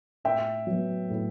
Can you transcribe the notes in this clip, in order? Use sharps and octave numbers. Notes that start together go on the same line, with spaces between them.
A2 E5 G5
F#3 B3
A2